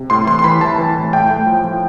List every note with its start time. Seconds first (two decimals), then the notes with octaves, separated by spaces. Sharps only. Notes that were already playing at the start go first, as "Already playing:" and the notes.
Already playing: C3
0.10 A2 C6
0.27 E3 C6
0.39 C6
0.44 E3 B5
0.61 E3 A5
0.78 E3
0.95 A2
1.13 A2 G5
1.30 A2
1.46 F3
1.64 F3